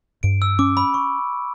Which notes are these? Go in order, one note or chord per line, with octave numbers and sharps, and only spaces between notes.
G2 D7
E6
C#4 D6
B5
C#6